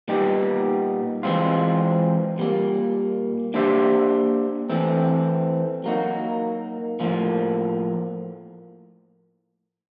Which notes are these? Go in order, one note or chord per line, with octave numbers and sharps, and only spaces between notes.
A#2 G3 B3 D#4 G4
E3 G#3 C4 F4
A#2 G3 A#3
A#3 D4 G4 C5 E5
E3 A3 C4
F#3 A#3 D#4 F#4
A2 F3 A#3